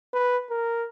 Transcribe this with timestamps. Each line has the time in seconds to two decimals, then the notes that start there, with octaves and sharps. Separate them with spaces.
0.14 B4
0.50 A#4